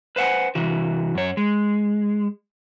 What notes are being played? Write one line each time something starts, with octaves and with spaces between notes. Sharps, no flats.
B4 C5 F5 F#5 G#5
C3 E3 F#4
F#2 C#5
G#3